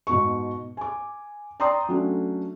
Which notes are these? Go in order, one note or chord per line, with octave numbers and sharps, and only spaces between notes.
G#2 B2 C#6
G#5 D6
D5 G5 A#5 C6 D#6
F#3 A3 C#4 D4